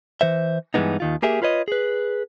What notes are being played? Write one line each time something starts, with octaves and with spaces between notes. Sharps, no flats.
E3 C5 E5
G2 E3 F3 G#3 B3 D#4
D#2 D#3 F4
A#3 G4 G#4 A#4 E5
F4 B4 C#5 D#5
G#4 B4